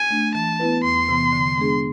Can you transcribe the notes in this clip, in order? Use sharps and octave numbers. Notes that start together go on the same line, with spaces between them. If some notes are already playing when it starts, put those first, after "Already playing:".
Already playing: G#5
A3 D4
E3 A5
B3 E4 B4
E2 C6
C3 E3 B3
D3
G#3 B3 D4 G#4